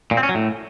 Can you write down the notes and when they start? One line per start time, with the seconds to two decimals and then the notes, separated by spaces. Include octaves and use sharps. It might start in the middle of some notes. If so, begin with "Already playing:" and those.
0.11 A#2
0.17 C4
0.23 C#4
0.29 F#3
0.35 A2